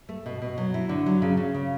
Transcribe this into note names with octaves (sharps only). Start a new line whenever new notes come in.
A3
B2
B2
F#3
E4
D3
F#3
C#3
C#3
C#3